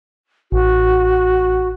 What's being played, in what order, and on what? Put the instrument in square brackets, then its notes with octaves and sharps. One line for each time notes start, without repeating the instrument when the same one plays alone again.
[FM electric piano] A1 [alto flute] F#4